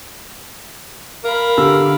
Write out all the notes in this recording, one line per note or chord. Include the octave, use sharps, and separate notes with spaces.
A#4 F5 B5
D3 G4 E6